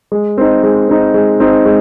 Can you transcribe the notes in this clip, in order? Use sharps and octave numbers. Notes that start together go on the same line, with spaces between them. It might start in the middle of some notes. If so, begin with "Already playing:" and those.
G#3
C4 D#4
G#3
C4 D#4
G#3
C4 D#4
G#3